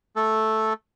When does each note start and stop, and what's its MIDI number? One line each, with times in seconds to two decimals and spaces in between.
0.16 0.73 57
0.16 0.73 69